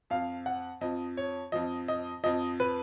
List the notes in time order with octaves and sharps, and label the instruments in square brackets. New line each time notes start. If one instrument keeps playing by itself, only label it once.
[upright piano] F2 F3 F5
F#5
F2 F3 D#5
C#5
F2 F3 D#5
D#5
F2 F3 D#5
B4